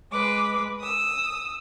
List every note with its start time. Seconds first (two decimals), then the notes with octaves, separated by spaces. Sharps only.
0.11 G#3 B4 D6
0.79 D#6 E6